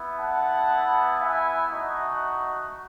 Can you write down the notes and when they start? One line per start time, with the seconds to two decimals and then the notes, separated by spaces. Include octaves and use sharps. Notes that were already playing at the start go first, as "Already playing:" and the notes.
Already playing: B3 E4
0.18 F#5 A5
0.69 B3 E4
1.21 E5 G#5
1.72 A3 D#4 F#4 D#5 F#5